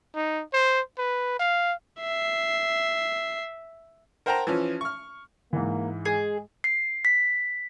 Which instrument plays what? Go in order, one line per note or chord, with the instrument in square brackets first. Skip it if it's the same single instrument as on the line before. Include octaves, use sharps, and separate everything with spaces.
[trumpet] D#4
C5
B4
F5
[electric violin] E5 C7
[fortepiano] A#4 C5 F#5 G5 A5 A#5
E3 F3 C#4
C#6 F6
[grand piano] G#2 E3 [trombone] A#3
[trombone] G#3 [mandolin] G#4
[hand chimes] C7
B6